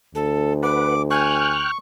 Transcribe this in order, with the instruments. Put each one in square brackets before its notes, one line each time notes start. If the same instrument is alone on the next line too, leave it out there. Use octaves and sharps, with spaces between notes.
[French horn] D2 [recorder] A4
[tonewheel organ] B4 F#5 [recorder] D6
[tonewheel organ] G5 F6 F#6 [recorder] G#5 [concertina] C#6